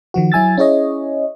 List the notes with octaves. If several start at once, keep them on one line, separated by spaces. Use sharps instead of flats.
D#3 F3 F#4
F#3 E4 G#5 E6 A6
C#4 E4 G#4 C#5 D#5